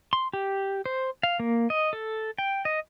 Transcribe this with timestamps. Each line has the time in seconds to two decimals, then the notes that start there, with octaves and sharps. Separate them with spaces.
0.13 C6
0.33 G4
0.86 C5
1.23 F5
1.40 A#3
1.70 D#5
1.93 A4
2.38 G5
2.65 D#5